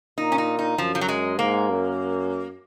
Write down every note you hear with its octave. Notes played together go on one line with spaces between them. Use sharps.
A#2 D#4
C#4
D#4
D#4
F#2 F3
F3
F#3
G#3
G#2 A#3
F#2